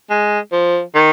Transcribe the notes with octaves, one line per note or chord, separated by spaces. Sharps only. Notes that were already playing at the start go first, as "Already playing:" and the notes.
G#3
F3
D#3